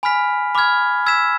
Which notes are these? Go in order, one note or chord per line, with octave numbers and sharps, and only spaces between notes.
G#5 B5 F6 B6
B5 D6 F6 G#6
E6 G#6 B6 E7